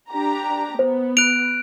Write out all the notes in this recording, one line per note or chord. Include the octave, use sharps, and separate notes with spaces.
D4 G4 A#5
B3 C5
F#6 D7 F7